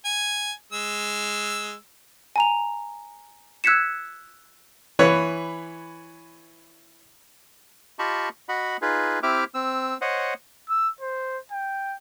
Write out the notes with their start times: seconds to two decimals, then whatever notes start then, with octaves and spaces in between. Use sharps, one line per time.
0.05 G#5
0.72 G#3 E6
2.36 G#5 A#5 F7
3.64 E6 F#6 G#6 B6 C#7 E7
4.99 E3 B4 C#5
7.99 F4 G4 D#5 A5 B5 C#6
8.49 F#4 D#5 F#5 B5
8.82 D#4 F4 G#4 B4
9.23 C4 E4 G4 E5 D6 F6
9.54 C4 E6
10.01 C5 C#5 D#5 F#5
10.70 E6
11.01 C5
11.52 G5